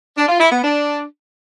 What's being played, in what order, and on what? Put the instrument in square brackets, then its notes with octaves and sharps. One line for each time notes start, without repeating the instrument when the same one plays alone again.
[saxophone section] D4
F4
E4
B3
D4